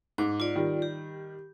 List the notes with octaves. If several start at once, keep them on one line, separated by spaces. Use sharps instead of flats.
G#2 D6
F4 D5
D#3 G3
G4